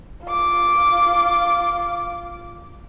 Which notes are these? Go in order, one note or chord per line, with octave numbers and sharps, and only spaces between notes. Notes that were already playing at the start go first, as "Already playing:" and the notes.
F4 D6